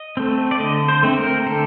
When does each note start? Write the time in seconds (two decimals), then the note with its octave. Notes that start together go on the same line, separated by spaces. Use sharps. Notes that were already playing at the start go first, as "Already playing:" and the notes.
Already playing: D#5
0.17 A3 C4
0.51 D5
0.60 D3 D#5
0.88 C5
1.03 A3 C4
1.17 A#4
1.46 D3 A4